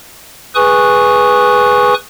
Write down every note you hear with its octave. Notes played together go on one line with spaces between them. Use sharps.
G#4 B4 G#5 C#6 D#6 F#6